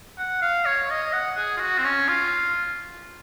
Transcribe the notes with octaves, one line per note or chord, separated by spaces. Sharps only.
F#5
F5
C#5
D#5
F#5
G#4
F4
F#4
C4
C#4
F4